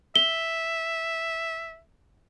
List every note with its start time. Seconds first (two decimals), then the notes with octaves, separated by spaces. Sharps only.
0.16 E5 G7